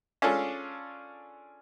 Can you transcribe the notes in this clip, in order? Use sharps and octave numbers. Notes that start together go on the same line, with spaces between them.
C#4 D4 F4 G#4 A4